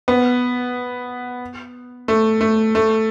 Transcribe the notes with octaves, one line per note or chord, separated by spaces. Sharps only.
B3
A3
A3
A3